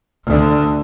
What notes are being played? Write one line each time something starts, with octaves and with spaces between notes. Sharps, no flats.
D2 D3